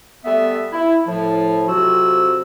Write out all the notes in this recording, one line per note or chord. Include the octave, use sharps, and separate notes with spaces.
G3 A3 B3 E5
E4
A2 F3
F2 C3 F#3 F#4 E6